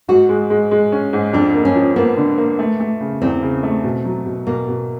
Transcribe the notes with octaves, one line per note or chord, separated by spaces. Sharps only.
G#2 F#4
G#3
G#3
G#3
C#4
G#2
F2 D4
A#3
C#4
F3
A#3 B3
D3
A#3
A3
A3
C#3
E2 C4
C#3
A3
B2
F#3
B2
B2 A#3
B2